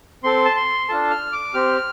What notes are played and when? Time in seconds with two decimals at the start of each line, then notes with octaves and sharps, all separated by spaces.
0.24 C4 A4 C6
0.45 A5
0.56 C6
0.89 D4 F4 A4 A5
1.11 F6
1.32 D6
1.54 C4 G4 F6